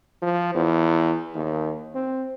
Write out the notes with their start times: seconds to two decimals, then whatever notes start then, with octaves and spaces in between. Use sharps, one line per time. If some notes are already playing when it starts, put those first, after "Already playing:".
0.22 F3
0.55 E2
1.35 D#2
1.95 C4